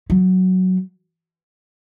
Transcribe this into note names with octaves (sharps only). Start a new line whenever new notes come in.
F#3